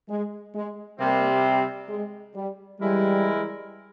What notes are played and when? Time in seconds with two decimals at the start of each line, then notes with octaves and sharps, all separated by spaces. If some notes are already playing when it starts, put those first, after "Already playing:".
0.09 G#3
0.55 G#3
0.99 C3 G3 A#3 C4
1.89 G#3
2.35 G3
2.80 E3 G3 G#3 E4 A#4